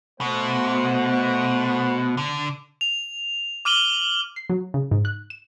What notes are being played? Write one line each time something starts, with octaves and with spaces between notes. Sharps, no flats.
B2 A3 C5 F#5
D3
F7
D6 F6 D#7 F#7 G7
C7
F#3
C#3
G#2
F#6
E7